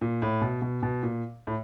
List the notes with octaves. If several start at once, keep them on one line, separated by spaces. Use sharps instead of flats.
A#2
A2
B2
B2
B2
A#2
A2